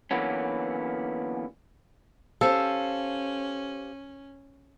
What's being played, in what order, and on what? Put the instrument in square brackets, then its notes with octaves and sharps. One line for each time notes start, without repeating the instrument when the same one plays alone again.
[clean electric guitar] D3 E3 F#3 A#3 B3 C#4
[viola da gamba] C#4 [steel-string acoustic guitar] G4 C5 F5 [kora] A4